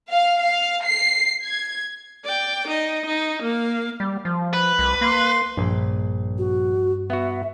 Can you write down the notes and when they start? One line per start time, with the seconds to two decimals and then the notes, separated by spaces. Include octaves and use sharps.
0.10 F5
0.40 F5
0.85 C7
1.45 G#6
2.24 D5 G5
2.67 D#4 D#5
3.06 D#4
3.42 A#3 F5
4.00 G3
4.25 F3
4.53 B4
4.79 C2
5.01 A#3 C6
5.57 A#1 G2
6.38 F#4
7.10 B3 F#4 E5